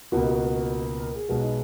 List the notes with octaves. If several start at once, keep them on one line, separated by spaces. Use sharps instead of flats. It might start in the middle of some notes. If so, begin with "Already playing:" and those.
C#2 B2 A#3 F#4
F#4
A#4
G#4
B1 B2 G#3 B3 F#4
D#4